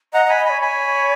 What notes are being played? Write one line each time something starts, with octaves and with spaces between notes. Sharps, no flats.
D#5 F#5 A#5
D#5
G#5 B5
D#5
C#5 G#5 B5
G#5 B5